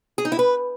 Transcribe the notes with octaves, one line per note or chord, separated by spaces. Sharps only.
G#4
D#4
E4
B4